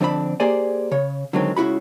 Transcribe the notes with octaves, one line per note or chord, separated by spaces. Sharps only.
F2 D3 C4 D4 E4 B5
A#3 G4 G#4 C5 D5 G#5
C#3 C#5
D3 D#3 F#3 G#3 C4
C#2 C#3 E4 F#4 B5